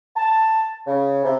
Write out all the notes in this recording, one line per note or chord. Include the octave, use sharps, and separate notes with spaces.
A5
C#3
C3